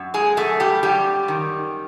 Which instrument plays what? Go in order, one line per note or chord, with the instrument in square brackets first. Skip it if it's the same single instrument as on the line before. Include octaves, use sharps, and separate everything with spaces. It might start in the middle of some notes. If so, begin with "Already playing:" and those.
Already playing: [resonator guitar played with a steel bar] F#2
G#3 G#4
F#2 A3 A4
G3 G4
F#2 G3 G4
D#3